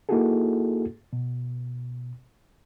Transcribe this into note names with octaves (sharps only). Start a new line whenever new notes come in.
A#3 D#4 E4 F#4 G#4 A4
B2